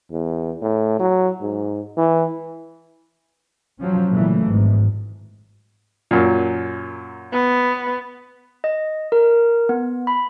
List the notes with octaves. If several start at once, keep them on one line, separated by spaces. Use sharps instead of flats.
E2
A2
F#3
G#2
E3
F3 F#3 C#4
A#2 C#3 E3 A3
G#1 G#2
F#2 A#2
B3
D#5
A#4
B3
B5